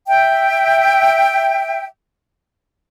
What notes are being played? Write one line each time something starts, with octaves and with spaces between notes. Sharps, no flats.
E5 G5